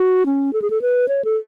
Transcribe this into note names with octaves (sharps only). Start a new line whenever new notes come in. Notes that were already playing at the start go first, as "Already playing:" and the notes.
Already playing: F#4
C#4
A4
G#4
A4
B4
C#5
A4